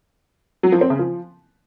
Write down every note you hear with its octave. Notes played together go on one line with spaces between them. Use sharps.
F#3
F3
C4
C#3
F3